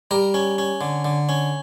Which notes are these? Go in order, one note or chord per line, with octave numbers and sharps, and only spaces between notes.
G3 A#4
C#4
C#4
D3
D3
C#4